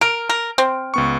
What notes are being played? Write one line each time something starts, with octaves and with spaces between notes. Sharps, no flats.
A#4 F6 D7
A#4
C4
C#2 B3 C#6